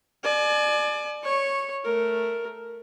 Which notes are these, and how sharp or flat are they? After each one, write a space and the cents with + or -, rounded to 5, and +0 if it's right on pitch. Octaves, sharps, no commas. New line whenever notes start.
D5 +25 G#5 +40
C#5 -5 C#6 -15
A3 +0 A#4 +0